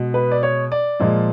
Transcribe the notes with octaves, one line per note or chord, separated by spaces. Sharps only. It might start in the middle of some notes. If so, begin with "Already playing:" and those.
Already playing: B2 G#3
B4
D5
C#5
D5
A#2 F3 G#3